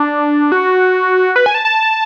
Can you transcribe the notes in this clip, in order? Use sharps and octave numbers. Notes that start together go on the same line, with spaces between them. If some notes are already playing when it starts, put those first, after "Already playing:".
Already playing: D4
F#4
B4
G#5
A5
A5